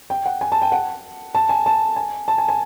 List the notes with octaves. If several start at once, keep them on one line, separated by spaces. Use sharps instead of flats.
G5
F#5
G#5
A5
G5
F#5
A5
G#5
A5
G#5
A5
G#5
G#5